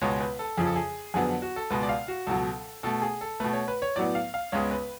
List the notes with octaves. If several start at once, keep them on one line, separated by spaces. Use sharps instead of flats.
C#2 B2 G#3 B3 C#5
B4
A4
F2 C#3 F3 G#4
A4
G#4
F2 D3 F#3 B3 G#4
F#4
A4
C#2 B2 G#3 B4
D5
F5
F#4
C#2 B2 F#3 A4
B2 A3 A4
G#4
A4
B2 A3 B4
C#5
B4
C#5
A2 F#3 B3 D5
F5
F5
C#2 C#3 G#3 B3 C#5
B4